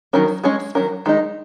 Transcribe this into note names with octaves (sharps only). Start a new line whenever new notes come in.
D#3 F#3 C#4 A#4
G#3 C#4 G#4 C#5
D#3 F#3 C#4 A#4
D#3 G#3 D#4